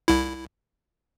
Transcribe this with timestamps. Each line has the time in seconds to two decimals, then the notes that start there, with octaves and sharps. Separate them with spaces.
0.08 C2 E4